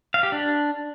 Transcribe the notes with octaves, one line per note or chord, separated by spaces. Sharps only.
F5
G4
D4